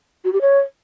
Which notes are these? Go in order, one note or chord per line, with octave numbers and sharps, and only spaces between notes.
F#4
G4
C#5